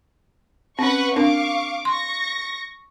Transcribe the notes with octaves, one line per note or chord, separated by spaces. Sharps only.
C4 C#4 B4 F#5 C#6
C4 D4 A#4 F5 C#6 D6
C6 C#6 A#6